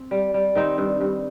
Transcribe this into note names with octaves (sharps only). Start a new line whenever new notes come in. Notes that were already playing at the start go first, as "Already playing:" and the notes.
Already playing: C4
G3
G3
D#3 C4 D#4
G2
G2